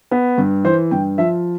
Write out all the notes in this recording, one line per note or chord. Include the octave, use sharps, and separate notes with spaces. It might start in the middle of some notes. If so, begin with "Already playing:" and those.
B3
G2
E3 C5
G2 G5
F3 E5